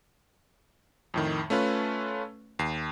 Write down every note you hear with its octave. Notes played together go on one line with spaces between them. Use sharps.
F2 A2 D#3
A3 C#4 F4 B4
D#2 C7